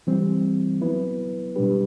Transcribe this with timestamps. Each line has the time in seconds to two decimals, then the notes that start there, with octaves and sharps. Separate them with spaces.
0.07 E3 G3 C4
0.81 F#3 B3 E4 B4
1.56 B2 G3 D4 G4 B4